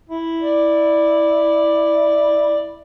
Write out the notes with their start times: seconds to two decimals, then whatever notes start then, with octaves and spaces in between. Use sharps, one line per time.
0.09 E4
0.42 D5